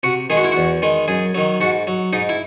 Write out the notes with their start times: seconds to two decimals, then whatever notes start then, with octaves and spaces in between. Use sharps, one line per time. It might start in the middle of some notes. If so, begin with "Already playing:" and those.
0.03 C3 F#4
0.30 D#3 G#3 G#4
0.37 F#4
0.44 E4
0.52 E2 F#4
0.82 D#3 G#3
1.08 F#2 G#4
1.35 D#3 F#3
1.61 G#2 F#4
1.87 F#3
2.13 G#2 D#4
2.29 E4